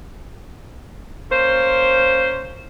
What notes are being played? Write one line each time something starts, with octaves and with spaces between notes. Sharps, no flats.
A#3 C#4 C5